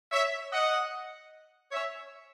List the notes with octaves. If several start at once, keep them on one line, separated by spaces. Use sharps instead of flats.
C#5 E5
D#5 F#5
C#5 E5